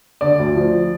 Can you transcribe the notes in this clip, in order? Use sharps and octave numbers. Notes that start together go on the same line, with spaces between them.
D3 D5
D2
F3